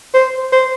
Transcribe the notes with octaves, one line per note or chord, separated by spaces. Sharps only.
C5
C5